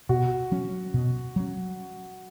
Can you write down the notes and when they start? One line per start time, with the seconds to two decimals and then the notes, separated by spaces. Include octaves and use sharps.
0.09 B2 F#4
0.52 F#3 C#4
0.94 B2
1.36 F#3 C#4